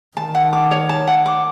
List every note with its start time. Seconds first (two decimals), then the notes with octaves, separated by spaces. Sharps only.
0.17 D#3 A5
0.35 F#5
0.53 D6
0.71 C#5
0.89 A5
1.08 F#5
1.26 D6